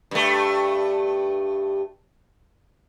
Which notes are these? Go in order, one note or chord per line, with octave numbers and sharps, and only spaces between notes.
G2 A3